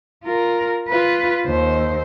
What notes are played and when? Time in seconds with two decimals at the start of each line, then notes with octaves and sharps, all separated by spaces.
0.24 F4 A#4
0.89 F4 B4
1.46 D#2 C5